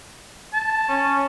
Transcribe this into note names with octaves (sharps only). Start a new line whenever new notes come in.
A5
C#4